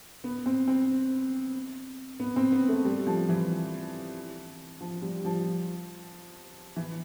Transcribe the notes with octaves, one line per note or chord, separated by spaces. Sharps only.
B3
C4
C4
B3
C4
B3
A3
G3
F3
E3
F3
G3
F3
E3